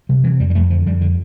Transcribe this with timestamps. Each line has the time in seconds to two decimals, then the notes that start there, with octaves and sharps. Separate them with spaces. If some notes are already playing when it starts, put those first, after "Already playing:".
0.09 C3 G3
0.24 C3 E3
0.40 F2 G3
0.50 G3
0.55 F2 A3
0.70 D3 F3
0.86 F2 G3
1.01 D3